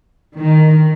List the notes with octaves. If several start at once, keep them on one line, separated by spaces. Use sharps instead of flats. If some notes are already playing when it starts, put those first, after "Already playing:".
D#3